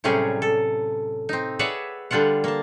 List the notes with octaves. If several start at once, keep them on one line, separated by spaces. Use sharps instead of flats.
A2 C3 F#3 G3 C#4 G#4
A4
C4 D#4
G#4 B4 C#5 D5 E5 F#5
D3 G3 D4 F4 F#5
A#3 A5